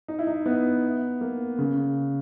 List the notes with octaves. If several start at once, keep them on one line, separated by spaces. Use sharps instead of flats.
D#4
E4
D#4
B3
A#3
C#3